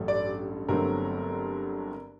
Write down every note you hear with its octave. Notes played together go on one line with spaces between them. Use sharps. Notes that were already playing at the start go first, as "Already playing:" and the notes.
Already playing: A1 G2 F#3 A3
D5
G1 G2 F#3 A3 C4 A#4